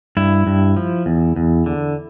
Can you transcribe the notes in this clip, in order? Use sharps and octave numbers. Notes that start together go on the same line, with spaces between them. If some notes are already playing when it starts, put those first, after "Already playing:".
G2 E4
G2
F3
E2
E2
D3